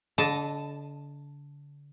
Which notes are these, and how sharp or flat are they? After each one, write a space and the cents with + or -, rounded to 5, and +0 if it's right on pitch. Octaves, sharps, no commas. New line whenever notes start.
D3 -35 D#5 +0 A5 +0